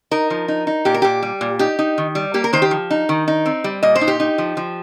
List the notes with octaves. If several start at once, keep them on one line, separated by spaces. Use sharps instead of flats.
D#4 A#4
F3
D#4
D#4
A#2 G4
A#4
A#2 G4
G3
A#2
D#4 G4
D#4
D#3
G3
A#3 G4
A#4
D#3 C5
G4
F3
D#4
D#3
D#4
C4
G3
A#2 D#5
C5
D#4
G4
D#4
F3
F3